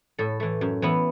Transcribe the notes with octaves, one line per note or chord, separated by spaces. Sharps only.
A2 A4
E3 A3
F#2
E3 B3 E4